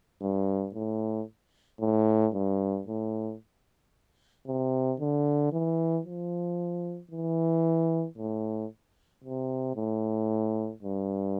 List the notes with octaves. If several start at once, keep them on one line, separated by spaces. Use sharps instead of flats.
G2
A2
A2
G2
A2
C3
D3
E3
F3
E3
A2
C3
A2
G2